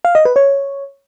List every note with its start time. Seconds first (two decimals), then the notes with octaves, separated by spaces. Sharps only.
0.05 F5
0.15 D#5
0.25 B4
0.36 C#5